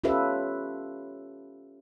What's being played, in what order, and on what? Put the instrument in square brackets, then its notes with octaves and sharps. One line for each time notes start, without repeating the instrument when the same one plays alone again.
[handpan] C#4 F4 G4 A4 B4 E5